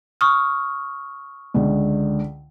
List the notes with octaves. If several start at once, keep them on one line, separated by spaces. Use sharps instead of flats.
C#6 D#6 F6
C#2 D3